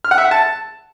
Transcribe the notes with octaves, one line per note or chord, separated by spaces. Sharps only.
F6
F#5
E5
F#5
A5